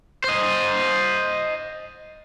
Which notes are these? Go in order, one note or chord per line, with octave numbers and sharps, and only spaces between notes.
C5 D#5